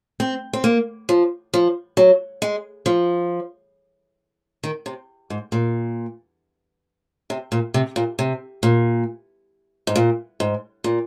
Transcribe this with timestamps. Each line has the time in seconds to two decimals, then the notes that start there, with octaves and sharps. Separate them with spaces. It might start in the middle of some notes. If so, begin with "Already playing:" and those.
0.20 C4
0.53 C4
0.64 A#3
1.09 F3
1.54 F3
1.97 F#3
2.42 G#3
2.86 F3
4.63 D#3
4.86 C3
5.30 G#2
5.52 A#2
7.30 C3
7.52 A#2
7.74 C3
7.96 A#2
8.19 C3
8.63 A#2
9.87 G#2
9.96 A#2
10.40 G#2
10.84 A#2